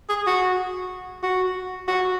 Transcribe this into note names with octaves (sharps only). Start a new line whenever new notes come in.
G#4
F#4
F#4
F#4